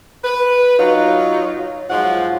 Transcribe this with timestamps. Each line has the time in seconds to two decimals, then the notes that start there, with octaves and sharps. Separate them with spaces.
0.24 B4
0.79 F#3 D#4 F4
1.90 G#2 F3 F#3 F4 C#5 F#5